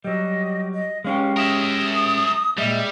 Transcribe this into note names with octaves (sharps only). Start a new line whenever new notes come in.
F#3 G3 D#5
D#5
G#3 C#4 G4 F5
A#4 E5 D#6
A#2 G3 G#3 E5